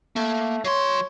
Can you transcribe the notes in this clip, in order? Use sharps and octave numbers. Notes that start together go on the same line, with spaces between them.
A3 A#3
F#3 C#5 C6